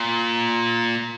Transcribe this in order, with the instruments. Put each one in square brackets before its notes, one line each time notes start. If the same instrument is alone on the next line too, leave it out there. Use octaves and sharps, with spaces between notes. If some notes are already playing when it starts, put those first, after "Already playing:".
Already playing: [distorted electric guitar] A#2